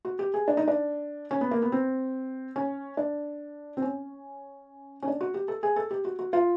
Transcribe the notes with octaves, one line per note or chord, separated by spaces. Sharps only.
F#4
G4
G#4
D4
D#4
D4
C#4
B3
A#3
B3
C4
C#4
D4
C4
C#4
C#4
D4
F#4
G4
A4
G#4
A4
G4
F#4
F#4
F4